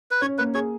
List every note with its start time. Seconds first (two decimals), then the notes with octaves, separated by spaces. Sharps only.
0.11 B4
0.21 C#4 C#5
0.38 A#3 B4
0.54 G#4 C#5